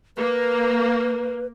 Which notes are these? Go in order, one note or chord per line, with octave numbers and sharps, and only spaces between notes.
A#3 B4